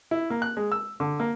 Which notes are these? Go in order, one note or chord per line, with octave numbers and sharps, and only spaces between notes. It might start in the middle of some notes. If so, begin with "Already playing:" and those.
E4
A#3
F#6
G#3
E6
D3
A#3